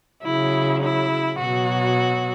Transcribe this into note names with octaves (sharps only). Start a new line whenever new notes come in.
C#3 F#3 E4
E4
B2 F#3 F#4